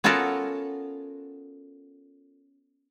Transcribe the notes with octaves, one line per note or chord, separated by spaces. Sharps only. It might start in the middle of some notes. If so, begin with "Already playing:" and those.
B3 C#4 F4 F#4 A4 A#4